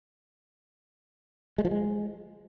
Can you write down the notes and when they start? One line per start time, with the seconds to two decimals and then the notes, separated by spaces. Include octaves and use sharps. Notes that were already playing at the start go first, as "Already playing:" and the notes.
1.58 G#3
1.65 F3
1.71 G#3